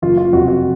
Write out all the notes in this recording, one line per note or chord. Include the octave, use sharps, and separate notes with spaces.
F#1 F4
F4
F2 C3 F#4
F#4